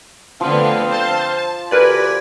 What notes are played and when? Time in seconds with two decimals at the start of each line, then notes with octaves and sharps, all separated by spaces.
0.41 D3 F3 A3 B3 C4 F5
0.88 C5 A5
1.34 A5
1.71 D2 G4 A#4 B4 D5 G#5 B5